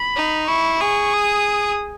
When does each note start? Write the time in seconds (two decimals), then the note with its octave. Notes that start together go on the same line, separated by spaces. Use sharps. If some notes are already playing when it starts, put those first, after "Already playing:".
Already playing: B5
0.16 D#4
0.48 E4 C#6
0.80 G#4 C#6
1.13 D#6